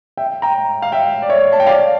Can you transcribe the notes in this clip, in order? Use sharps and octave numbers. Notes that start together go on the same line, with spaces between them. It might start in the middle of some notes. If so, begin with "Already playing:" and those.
E5 G5
G5 A#5
F5
E5 G5
D5
C#5 E5
A5
G5
D5 F5